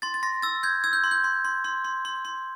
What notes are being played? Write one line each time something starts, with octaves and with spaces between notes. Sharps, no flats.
C6 A6
A6
C6 A#6
E6 A6
G6 G#6
E6 G#6
G6
C6
G6
C6
C6
C6
C6
C6
C6